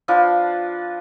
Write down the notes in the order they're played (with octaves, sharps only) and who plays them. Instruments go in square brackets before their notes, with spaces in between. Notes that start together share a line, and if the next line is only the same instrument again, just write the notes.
[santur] F3 D4 B4 F5